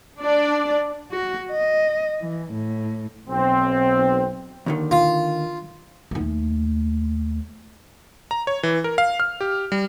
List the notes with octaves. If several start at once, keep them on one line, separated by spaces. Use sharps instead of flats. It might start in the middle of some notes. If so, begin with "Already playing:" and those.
D4 D5
F#4
D#5
E3
A2
B1 C4
D#2 D3 D#3
F4
D#2 A3
A#5
C#5
E3
A#4
F5
F6
G4
G3